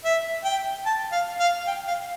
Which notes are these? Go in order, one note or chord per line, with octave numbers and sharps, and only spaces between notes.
E5
G5
A5
F5
F5
G5
F5